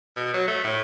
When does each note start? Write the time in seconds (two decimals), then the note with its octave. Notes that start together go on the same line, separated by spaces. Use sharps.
0.17 B2
0.34 F#3
0.48 A3
0.64 A2